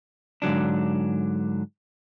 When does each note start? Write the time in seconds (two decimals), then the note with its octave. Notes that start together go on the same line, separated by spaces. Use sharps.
0.42 G#2 D3 F#3 D4